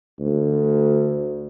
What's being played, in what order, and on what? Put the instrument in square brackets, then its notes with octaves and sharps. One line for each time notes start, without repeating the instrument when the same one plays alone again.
[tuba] D2